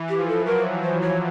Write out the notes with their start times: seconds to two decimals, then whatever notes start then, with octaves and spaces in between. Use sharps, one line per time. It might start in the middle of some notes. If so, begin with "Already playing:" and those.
Already playing: E3
0.09 G4
0.18 F3
0.28 A4
0.46 F#3 A#4
0.84 C5
1.01 C#5